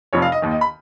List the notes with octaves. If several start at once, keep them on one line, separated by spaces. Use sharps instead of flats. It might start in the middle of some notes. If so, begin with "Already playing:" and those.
F1 F2 F3 C#5
F5
D#5
D#2 D#3
D#5
B5